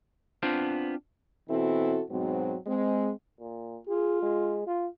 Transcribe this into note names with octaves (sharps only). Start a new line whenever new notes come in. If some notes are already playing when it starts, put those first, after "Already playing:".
B3 C4 D4 F4 C5
B2 E3 C4 E4 F#4 A4
G#2 B2 F#3 C4
G#3 C4
A#2
F4 G#4
G#3
F4